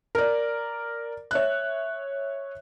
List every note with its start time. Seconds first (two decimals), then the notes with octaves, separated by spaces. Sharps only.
0.15 A#4 D5
1.31 C#5 E5 F#6